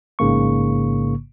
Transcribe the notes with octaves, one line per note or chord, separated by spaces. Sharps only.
A1 G#2 C#3 A#3 C#6